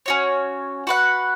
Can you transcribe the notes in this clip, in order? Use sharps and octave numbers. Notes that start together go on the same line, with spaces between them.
C#4 F#4 C#5
F#4 B4 F#5